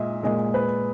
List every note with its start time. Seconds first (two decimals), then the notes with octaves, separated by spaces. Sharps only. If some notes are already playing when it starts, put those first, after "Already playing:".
Already playing: A#2 G#3 D#5 E5
0.23 A#2 G#3 D#5
0.54 B4